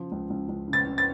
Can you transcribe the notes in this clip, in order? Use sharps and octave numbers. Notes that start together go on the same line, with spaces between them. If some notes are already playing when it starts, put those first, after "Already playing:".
Already playing: C#3 F3
C#2
C#2
C#2
C#3
A6
C#3
A6